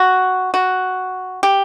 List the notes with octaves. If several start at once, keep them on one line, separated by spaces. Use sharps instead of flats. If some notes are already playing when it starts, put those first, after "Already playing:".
Already playing: F#4
F#4
G4